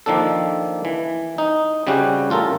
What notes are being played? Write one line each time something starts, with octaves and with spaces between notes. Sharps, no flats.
D#3 F3 A#3 D4 A4
E3
D#4
C#3 G3 C4 C#4 F#4 G4
A1 F4 A4 A#4